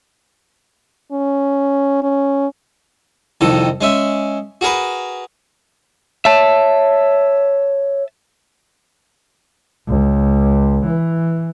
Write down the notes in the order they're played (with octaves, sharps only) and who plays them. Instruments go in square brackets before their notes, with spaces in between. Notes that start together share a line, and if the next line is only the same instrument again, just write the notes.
[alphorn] C#4
C#4
[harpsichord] C2 F2 D#3 A4
G#3 C#4 E5
F#4 G#4 A#4 B4
[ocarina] C#5 [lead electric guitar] E5 A5
[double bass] C#2
E3